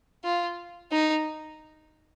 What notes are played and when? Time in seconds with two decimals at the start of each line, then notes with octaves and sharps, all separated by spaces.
0.24 F4
0.92 D#4